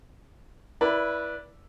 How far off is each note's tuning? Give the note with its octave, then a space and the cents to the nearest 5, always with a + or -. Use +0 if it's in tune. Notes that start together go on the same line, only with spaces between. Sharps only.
E4 +0 B4 -20 D5 -5